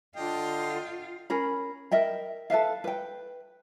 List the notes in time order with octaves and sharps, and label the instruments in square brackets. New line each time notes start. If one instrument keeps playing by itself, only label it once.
[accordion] D3 [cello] F4 [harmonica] D#5 G5
[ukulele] C#4 G#4 A#4 B5
A#4 D#5 E5 G5
A4 B4 E5 F5
B4 G5